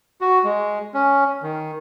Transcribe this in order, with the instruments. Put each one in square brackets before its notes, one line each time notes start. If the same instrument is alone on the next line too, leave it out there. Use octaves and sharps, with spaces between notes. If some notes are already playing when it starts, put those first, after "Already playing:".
[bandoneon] F#4
G#3
C#4
D#3